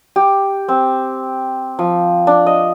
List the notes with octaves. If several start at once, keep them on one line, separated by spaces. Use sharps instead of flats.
G4
C4
F3
D4
D#5